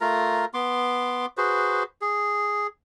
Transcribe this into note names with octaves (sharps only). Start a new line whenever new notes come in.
A3 F4 A#4 A#5
B3 C6 D6
F#4 G#4 B4 C5
G#4